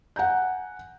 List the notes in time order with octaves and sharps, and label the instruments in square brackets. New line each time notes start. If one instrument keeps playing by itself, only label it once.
[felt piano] F#5 G#5 A#5 G6